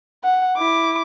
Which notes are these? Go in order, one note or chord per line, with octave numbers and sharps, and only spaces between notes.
F#5
E4 D6